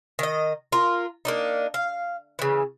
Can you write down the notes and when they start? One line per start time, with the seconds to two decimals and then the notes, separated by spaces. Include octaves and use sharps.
0.19 D#3 D#5
0.72 F4 A#4
1.25 A#3 D4 D#4
1.74 F5
2.39 C#3 E3